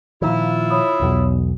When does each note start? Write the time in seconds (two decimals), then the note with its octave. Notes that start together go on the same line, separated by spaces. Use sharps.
0.22 A#2 D#3 F3 E4 F4
0.70 C#5 B5 D#6
1.01 B1 E2